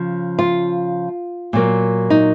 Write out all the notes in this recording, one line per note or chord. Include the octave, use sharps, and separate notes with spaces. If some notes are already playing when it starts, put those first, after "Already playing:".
Already playing: C#3 F3
F4
A#2 F#3 A#3
D#4